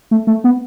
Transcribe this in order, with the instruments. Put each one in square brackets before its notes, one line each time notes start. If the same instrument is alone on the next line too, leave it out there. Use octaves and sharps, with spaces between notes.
[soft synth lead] A3
A3
B3